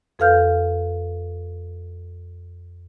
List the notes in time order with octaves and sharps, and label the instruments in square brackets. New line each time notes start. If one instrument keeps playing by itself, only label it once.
[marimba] F2 A4 B4 F5 F6 G6